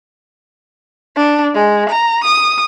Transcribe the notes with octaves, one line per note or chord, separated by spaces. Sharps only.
D4
G#3
A#5
D#6